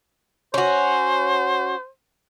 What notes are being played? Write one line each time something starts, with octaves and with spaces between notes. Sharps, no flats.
C#4 F#4 C5